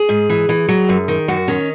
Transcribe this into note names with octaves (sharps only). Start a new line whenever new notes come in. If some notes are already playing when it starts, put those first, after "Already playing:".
Already playing: G#4
G#2
E3
E3
F#3
F#2
D#3
F#2 F#4
D#3 C#4